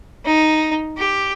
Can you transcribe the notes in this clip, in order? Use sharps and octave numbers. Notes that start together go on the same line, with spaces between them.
D#4
G4